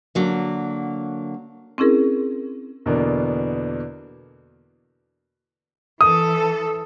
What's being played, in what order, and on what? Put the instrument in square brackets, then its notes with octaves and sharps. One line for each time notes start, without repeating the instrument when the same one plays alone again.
[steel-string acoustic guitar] D3 F#3 A#3
[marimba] C4 C#4 E4 G#4 A#4
[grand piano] E2 B2 D3 A#3 B3 D4
[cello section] E3 A4 [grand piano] D#6